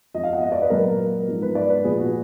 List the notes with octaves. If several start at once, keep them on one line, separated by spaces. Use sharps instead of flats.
F2 F3 D#5
F5
F#5
D#5
D5
B4
A#2 F#3 A#4
G#2 F3
B4
D5
B4
A#2 F3 G#4
F#4